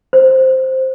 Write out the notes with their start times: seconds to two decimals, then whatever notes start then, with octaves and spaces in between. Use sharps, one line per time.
0.13 C5